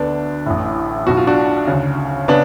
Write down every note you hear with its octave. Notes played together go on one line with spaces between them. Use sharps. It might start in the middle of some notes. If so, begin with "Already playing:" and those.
Already playing: D2 D3 B3 D4
A1 A2
B1 B2 F#4
F4
D4 F#4
D2 C#3
C#3 B3 D4